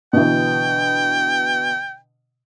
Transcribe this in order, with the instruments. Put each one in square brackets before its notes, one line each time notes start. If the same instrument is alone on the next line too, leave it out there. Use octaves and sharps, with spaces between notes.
[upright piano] B2 D3 E3 [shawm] G5